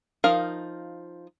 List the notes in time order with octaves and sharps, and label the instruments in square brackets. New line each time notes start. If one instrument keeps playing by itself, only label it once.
[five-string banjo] F3 D#4 A#4 F5